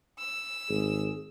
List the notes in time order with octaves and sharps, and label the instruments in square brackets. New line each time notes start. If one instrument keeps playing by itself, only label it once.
[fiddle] E6
[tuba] G#1 [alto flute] G#4